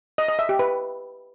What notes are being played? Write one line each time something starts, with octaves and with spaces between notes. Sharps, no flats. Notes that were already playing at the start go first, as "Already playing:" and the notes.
D#5
D#5
E5
G4
B4